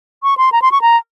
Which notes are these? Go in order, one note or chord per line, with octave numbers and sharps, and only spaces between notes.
C#6
C6
A#5
C6
C#6
A#5